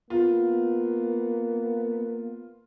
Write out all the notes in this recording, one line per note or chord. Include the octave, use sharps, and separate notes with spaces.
A#3 B3 F4